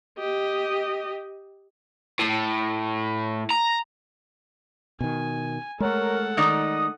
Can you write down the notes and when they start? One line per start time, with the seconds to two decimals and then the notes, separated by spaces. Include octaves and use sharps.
0.19 G4 D#5
2.19 A2
3.50 A#5
5.01 B2 D#3 G#5
5.80 G#3 A3 A4 A#4 C#5 F#5
6.37 D#3 D#4 D5 D#6